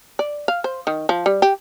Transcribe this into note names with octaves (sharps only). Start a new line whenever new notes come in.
D5
F5
C5
D#3
F3
G3
G4